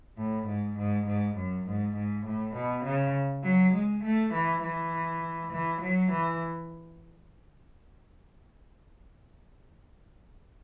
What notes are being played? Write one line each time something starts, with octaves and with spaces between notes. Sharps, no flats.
A2
G#2
G#2
G#2
F#2
G#2
G#2
A2
B2
C#3
F#3
G#3
A3
E3
E3
E3
F#3
E3